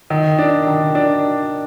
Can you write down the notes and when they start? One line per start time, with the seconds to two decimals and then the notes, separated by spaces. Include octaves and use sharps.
0.10 D#3
0.39 D4
0.67 D#3
0.95 D4